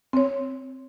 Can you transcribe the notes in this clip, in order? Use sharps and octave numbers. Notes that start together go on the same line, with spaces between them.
C4 C#5